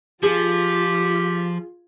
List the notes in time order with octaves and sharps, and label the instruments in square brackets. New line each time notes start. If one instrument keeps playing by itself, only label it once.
[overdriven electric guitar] F3 [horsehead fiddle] F4 [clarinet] G4 [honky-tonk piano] G#4